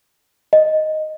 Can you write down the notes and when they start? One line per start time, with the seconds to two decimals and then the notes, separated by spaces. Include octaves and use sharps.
0.53 D#5